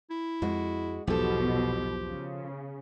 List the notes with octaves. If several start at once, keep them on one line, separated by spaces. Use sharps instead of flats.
E4
F2 G#3 F#4
B1 E2 G#2 B2 F3 G4 A4
C#3